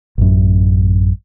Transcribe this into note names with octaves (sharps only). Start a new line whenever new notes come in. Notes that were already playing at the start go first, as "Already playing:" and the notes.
A1 F#2